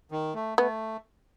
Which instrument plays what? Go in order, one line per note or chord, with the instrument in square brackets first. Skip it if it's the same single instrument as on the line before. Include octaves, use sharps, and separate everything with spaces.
[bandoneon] D#3
A3
[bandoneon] A3 [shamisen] B3